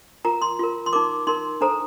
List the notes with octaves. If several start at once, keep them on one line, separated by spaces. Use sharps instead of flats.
F4 A#4 A#5
C6
F4 A#4
C6
D#4 A#4 D6
D#4 A#4 C6
D4 A4 C5 A#5